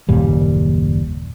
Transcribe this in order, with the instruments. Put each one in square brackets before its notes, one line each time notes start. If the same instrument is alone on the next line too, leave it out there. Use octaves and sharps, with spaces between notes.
[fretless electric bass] F#1 D#2 A#2 G3